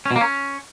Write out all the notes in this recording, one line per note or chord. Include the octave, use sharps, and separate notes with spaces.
C#4
B2
A#3
C#4